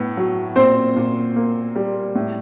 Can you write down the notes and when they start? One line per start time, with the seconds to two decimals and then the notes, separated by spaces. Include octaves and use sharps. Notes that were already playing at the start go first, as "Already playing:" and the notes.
Already playing: A2 B3
0.17 F#3
0.56 A#2 C4 C5
0.96 A#2
1.36 A#3
1.76 G3
2.15 A2